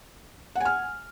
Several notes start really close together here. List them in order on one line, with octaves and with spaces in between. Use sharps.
F#5 G#5 F6